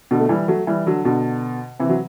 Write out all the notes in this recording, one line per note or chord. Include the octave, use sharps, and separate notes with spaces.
B2 D3
A3
E3 G3
F#3 A3
E3 G3
D3 F#3
B2 D3
C3 E3
F#3